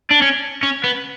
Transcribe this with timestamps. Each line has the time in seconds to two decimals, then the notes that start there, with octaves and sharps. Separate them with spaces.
0.10 D4
0.22 C#4
0.63 C#4
0.84 B3